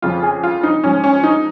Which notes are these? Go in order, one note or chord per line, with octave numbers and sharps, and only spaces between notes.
F2 C#3 F3 F4
G#4
F4
D#4
G#2 F3 C#4
C#4
D#4